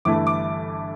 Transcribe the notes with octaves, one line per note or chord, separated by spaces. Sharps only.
G1 G2 E3 A3 E4 D6
D6